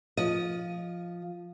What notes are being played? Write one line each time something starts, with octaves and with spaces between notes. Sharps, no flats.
F3 D#5